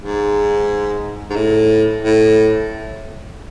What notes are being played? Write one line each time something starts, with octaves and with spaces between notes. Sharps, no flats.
G#2
G#2
A2
A2